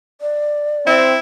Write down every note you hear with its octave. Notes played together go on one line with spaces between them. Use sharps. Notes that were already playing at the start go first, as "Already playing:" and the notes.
D5
C4 E4